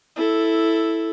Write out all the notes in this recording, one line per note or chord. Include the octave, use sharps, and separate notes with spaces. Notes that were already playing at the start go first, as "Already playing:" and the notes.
E4 A4